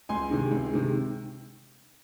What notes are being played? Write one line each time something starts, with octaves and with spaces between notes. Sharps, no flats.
C#2 G#5 C6
C3 D#3 G#3
C#2
C3 D#3 G#3